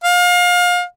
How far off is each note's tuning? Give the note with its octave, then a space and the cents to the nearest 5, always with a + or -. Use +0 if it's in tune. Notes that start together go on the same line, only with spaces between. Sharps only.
F5 +30